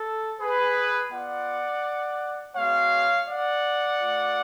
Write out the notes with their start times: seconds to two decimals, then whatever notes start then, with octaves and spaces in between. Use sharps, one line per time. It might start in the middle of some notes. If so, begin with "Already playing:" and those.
Already playing: A4
0.41 G#4 B4
1.13 B3 F4 D5 F#5
2.57 G#3 B3 F#4 C#5 F5
3.29 D5 F#5
4.01 A3 F4